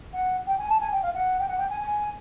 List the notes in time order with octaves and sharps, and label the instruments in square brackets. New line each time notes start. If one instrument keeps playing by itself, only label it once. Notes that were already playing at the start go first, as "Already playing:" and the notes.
[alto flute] F#5
G5
G#5
A5
G#5
G5
F5
F#5
G5
F#5
G5
G#5
G#5